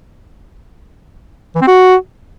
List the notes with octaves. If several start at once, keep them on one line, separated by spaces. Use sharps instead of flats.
E3
C4
F#4